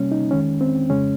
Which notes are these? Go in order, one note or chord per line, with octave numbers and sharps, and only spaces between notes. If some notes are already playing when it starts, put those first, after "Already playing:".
Already playing: C3 G3 A#3 C#4
D#4
F2 D#3 G#3 C#4
C4
F2 C#3 G#3 C#4